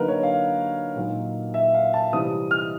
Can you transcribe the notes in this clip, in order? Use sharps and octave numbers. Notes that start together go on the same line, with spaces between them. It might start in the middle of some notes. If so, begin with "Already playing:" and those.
Already playing: D3 F#3 A#3 D#4 A#4 B4
C#5
F5
A#2 F#3 A#3 D#4
E5
F5
A5
C3 E3 G3 C4 D#6
F6